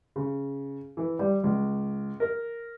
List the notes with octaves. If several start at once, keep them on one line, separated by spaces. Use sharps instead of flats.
C#3
E3
G3
C#2
A#4